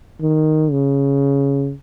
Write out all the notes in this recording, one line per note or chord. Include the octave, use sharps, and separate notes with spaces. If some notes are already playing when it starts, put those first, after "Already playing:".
D#3
C#3